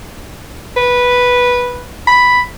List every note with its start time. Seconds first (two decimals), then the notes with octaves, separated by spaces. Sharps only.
0.76 B4
2.07 B5